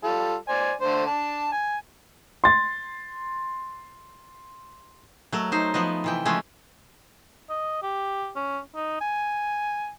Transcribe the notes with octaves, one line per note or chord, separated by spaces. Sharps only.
G3 F4 A4
C5 D5 G#5
D3 A3 C5
D4 A5
G#5
C6 A6
F#3 A3 A#4
D#4 C5
F3 B3 D#5
C3 E3 G5
C#3 F3 G#3 A3 C#4
D#5
G4
C#4
D#4
G#5